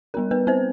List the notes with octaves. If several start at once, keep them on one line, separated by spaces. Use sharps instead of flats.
G3 B3 D4 A#4
B3 B4
C4 C5